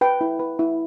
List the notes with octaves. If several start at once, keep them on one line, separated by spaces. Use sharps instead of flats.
B4 G5
E4
B4
E4